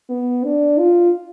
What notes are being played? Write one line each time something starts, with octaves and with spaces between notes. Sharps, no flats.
B3
D4
F4